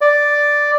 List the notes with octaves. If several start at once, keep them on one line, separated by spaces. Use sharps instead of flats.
D5